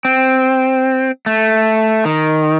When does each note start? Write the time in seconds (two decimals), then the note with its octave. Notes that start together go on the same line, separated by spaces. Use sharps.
0.05 C4
1.26 A3
2.05 D#3